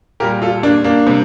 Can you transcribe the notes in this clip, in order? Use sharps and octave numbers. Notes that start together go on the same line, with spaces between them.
A#2 G3 G4 A#4
F4 A4
A#3 D4
A#3 D4
C3 G3